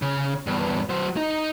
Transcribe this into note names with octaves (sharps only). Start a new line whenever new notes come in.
C#3
E2 G2
F#3 C5
D#4